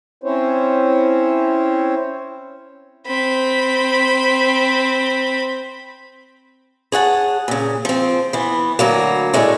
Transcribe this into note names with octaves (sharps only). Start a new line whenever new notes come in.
C4 C#4 E4 C5 C#5
C4 B5
G#4 C#5 F#5 A5
A#2 C#3
F3 C4
E3 B3
D2 F#3 A#3
A2 G#3 A3 A#4 D5